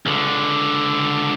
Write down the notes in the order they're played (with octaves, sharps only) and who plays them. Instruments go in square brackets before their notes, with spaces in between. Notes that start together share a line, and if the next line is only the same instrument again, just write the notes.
[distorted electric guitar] C#2 D3